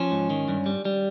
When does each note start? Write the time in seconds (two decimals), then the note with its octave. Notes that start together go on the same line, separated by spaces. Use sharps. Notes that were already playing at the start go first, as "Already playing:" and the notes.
Already playing: F3 C#4
0.11 G#2
0.30 D#3
0.48 G2
0.66 G3
0.85 G3